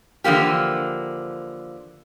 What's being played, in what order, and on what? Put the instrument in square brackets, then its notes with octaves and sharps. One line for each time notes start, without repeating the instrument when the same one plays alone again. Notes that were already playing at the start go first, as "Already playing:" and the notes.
[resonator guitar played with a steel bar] D3 E3 F3 A#3 G4